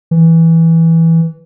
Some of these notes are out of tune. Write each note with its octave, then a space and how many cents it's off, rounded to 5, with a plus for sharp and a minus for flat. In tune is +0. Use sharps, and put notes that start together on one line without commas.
E3 -5